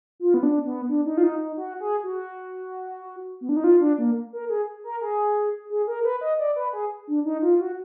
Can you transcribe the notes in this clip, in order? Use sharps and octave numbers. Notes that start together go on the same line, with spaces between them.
F4
B3
D4
B3
D4
D#4
F4
D#4
D#4
F#4
G#4
F#4
B3
D4
D#4
F4
D4
A#3
A#4
G#4
A#4
G#4
G#4
A#4
B4
D#5
D5
B4
G#4
D4
D#4
F4
F#4